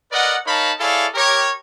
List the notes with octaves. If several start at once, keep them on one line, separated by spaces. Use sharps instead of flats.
A#4 B4 D5 D#5 F#5
D#4 A#4 C#5 F5 A5 B5
E4 G#4 A4 C#5 D5 F5
G4 A#4 C#5